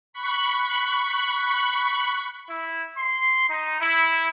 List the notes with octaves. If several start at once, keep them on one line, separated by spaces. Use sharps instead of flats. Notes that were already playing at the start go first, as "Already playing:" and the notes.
B5 C#6 F#6
E4
C6
D#4
E4